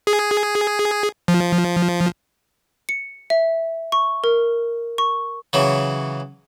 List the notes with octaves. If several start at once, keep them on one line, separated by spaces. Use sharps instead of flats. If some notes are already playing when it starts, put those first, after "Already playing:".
G#4
F3
C#7
E5
C#6
A#4
C#6
C#3 E3 F#3